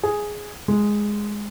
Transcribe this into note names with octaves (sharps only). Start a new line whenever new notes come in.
G#4
G#3